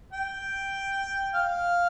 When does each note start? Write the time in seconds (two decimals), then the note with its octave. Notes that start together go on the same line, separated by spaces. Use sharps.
0.13 G5
1.34 F5